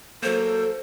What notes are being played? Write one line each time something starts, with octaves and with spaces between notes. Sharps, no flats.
F#3 A#3 A4 C5